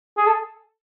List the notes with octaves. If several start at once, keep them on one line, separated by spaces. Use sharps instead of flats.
G#4
A4